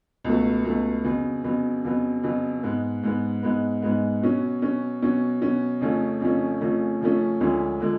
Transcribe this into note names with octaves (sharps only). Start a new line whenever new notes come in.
C#2 B2 F#3 A3
C#2 B2 F#3 A3
F2 C#3 F#3 B3
F2 C#3 F#3 B3
F2 C#3 F#3 B3
F2 C#3 F#3 B3
G#2 G#3 B3
G#2 G#3 B3
G#2 G#3 B3
G#2 G#3 B3
B2 F#3 C#4
B2 F#3 C#4
B2 F#3 C#4
B2 F#3 C#4
F2 C#3 F3 A3 C#4
F2 C#3 F3 A3 C#4
F2 C#3 F3 A3 C#4
F2 C#3 F3 A3 C#4
D2 D3 F3 G#3 C#4
D3 F3 G#3